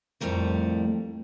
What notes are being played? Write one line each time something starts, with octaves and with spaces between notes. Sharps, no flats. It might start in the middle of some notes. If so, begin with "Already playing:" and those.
F2 A2 G3 A3 A#4